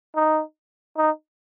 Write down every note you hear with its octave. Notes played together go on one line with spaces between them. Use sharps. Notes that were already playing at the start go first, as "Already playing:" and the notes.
D#4
D#4